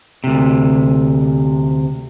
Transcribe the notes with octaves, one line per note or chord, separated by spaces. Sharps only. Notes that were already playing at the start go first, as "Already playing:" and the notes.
D2 C3